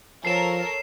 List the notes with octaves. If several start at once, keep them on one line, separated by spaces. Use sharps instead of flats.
F3 A4 A#4 C#5 C7 E7